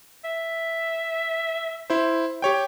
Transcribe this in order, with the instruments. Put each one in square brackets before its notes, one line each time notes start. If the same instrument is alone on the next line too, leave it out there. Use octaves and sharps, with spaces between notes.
[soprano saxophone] E5
[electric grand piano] E4 C5
G4 C#5 G5